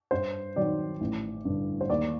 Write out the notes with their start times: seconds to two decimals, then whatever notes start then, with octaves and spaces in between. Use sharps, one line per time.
0.11 G2 C5
0.56 D#3 F#3 C4 D5
1.01 A1
1.45 G2 D3
1.81 C5
1.90 D#2 D5